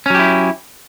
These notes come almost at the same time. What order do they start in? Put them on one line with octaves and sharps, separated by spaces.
C#4 F#3 G4 E4